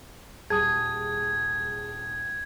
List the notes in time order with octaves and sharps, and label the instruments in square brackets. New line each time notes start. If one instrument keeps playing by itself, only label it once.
[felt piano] D#1 G3 D#7 [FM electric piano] G#4 [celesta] A5 D#6 [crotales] G#6